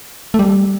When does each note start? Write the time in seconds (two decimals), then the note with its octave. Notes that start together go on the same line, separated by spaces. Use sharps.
0.34 A3
0.39 G3